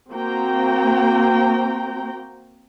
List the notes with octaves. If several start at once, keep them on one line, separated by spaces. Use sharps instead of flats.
A#3 C4 F#4 G5 A#5